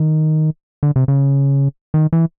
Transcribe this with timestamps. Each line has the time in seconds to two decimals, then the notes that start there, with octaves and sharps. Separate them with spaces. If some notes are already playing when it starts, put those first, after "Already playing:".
Already playing: D#3
0.83 D3
0.96 C3
1.08 C#3
1.94 D#3
2.13 E3